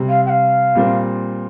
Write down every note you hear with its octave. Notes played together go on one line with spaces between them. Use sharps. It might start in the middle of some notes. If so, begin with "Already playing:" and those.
Already playing: C3 G3 C4
F5
G5
F5
A#2 G3 C4